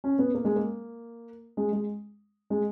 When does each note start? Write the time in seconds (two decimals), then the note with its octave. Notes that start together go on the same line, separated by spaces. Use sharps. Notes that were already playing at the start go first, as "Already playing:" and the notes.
0.04 C#4
0.19 B3
0.34 A#3
0.45 G#3
0.56 A#3
1.57 G#3
1.73 G#3
2.50 G#3